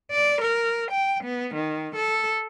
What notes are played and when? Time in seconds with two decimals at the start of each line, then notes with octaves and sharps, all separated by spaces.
0.12 D5
0.42 A#4
0.91 G5
1.24 B3
1.54 D#3
1.96 A4